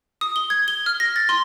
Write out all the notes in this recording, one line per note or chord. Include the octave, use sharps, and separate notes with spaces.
D#6
G7
G#6
G7
F6
A#6
A6
C6